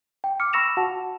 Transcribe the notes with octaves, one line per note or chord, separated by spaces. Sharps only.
G5
D6 F6 C#7
B5 C#6 E6 A#6 E7 F7
F#4 F#5 A5